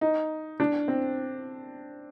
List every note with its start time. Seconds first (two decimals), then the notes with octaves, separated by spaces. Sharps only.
0.01 D#4
0.60 D4
0.88 C4